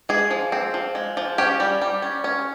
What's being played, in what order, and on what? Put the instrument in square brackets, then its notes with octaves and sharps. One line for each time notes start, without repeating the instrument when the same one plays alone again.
[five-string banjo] G#3 G#4
F3
C4
F3
G#3
F3
C#4 G4
G3
G3
C#4
C#4